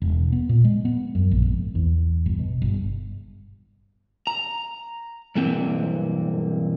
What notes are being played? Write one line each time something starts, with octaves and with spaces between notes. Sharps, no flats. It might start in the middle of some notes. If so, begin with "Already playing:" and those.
E1
B3
A#2
G#3
B3
F#2
A#1
G#1
E2
G1
B2
G1
A#5
B1 G2 E3 A#3 C4